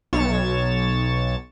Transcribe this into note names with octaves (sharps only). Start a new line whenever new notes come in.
B1 C#5 C#6 A6 E7